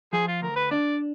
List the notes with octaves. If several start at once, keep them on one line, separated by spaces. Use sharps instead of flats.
F3 G#4
F4
D2 A#4
B4
D4 D5